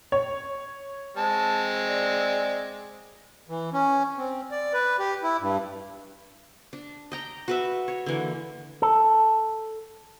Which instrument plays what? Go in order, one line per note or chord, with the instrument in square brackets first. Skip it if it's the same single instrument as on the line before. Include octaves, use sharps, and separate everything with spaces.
[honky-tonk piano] C#5
[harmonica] G#3 C4 [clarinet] A5
[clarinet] D5
[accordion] E3
C#4
C4
D5
B4
G4
E4
G2
[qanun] D4
D#5 G5 A#5
F#4 B4 E5
C#5
D3 E3 A#3
[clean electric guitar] A4